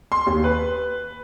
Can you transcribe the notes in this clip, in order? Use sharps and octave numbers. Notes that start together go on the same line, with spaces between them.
C6
D#2
B4